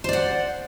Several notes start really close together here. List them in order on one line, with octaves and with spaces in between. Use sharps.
C5 D5 F#5